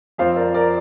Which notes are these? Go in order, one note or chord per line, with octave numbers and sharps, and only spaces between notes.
F2 F3 C4 C5 F5
A#4 D5
A#4 D5